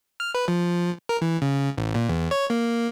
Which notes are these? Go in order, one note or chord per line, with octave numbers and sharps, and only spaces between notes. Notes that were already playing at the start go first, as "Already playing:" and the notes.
F6
B4
F3
A#4
E3
C#3
A1
A#2
E2
C#5
A#3